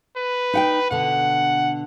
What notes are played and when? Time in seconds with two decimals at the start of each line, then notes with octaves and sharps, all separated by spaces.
0.17 B4
0.53 D#4 F#5 G5
0.91 B2 D3 F#5